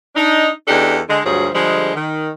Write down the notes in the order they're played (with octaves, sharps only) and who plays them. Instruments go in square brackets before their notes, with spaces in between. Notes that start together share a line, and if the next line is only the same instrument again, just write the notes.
[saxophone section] D4 D#4
E2 D4 D#4 G4 A4
D3 G#3
D2 G2 F3 F#3 G#4
D3 F3 G3 G#3
D#3